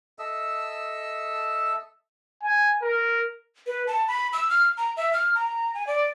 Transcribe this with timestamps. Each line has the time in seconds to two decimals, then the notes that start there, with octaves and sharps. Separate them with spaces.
0.19 A4 D#5 E5 E6
2.43 G#5
2.82 A#4
3.67 B4
3.87 A5
4.08 B5
4.33 E6
4.50 F6
4.77 A#5
4.97 E5
5.13 F6
5.35 A#5
5.74 G#5
5.87 D5